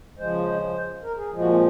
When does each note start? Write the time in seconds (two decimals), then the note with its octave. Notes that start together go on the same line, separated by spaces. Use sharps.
0.18 C#3 F3 G#3 C5
1.03 A#4
1.17 G#4
1.31 A#2 F3 G#3
1.40 F#4
1.50 C4